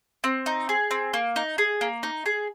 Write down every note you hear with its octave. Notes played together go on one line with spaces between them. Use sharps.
C4
D#4
G#4
C4
A#3
D#4
G#4
A#3
D#4
G#4